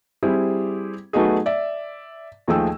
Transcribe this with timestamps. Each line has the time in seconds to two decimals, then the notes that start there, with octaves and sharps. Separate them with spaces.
0.23 G3 C4 E4 G4 G#4
1.13 F#3 A3 B3 D#4 F#4 G#4
1.46 D5 E5
2.48 D#2 F3 A3 G#4 G5 E6